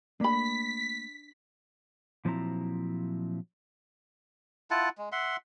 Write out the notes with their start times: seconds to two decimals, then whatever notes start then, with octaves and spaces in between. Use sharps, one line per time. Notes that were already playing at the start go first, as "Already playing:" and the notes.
0.20 A3 A#3 D4 B5 B6
2.25 A#2 F3 F#3 C4 E4 A#5
4.71 E4 F4 F#5 A5
4.98 G#3
5.12 E5 F#5 C6